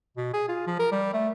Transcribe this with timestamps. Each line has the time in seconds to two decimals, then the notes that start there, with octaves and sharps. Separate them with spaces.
0.17 B2
0.33 G#4
0.48 F4
0.67 F3
0.79 A#4
0.92 G3
1.13 A3